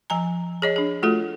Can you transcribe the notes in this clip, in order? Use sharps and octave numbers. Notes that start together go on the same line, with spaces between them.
F3 G#5 A#5
G#4 C#5 D#5
D4 G#4
A3 F4 F#4 A4